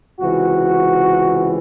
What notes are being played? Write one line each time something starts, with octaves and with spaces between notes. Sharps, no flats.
C#2 C3 E3 F#4